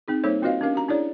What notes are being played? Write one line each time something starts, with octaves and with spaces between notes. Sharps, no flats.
C4 D#4 G#4
G3 A#3 D#4 A4 C5 C#5
C4 F4 F#4 B4 D#5 F5
C#4 D4 G4 A#4 F5
F#4 A#5
D4 E4 G#4 C#5 D5